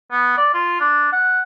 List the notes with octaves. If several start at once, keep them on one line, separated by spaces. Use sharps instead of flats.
B3
D5
F4
D4
F#5